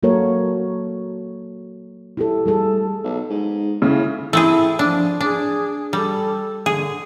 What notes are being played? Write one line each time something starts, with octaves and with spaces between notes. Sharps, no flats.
F#3 A#3 F#4 A4 A#4 C#5
E4 G4 A4
G3 G#4 A4
B1
G#2
A2 C#3
A3 C4 E4 G#4
F3 D4
D4 G#4
G3 A4
D3 G#4